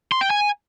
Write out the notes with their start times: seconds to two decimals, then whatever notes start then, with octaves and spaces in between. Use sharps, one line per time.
0.12 C6
0.21 G5
0.30 G#5